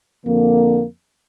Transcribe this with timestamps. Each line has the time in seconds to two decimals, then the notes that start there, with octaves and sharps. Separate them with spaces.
0.25 F2 D3 A#3